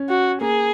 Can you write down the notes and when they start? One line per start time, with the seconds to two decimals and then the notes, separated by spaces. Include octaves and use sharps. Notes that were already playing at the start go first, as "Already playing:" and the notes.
Already playing: C#4
0.09 F#4
0.41 A#3 G#4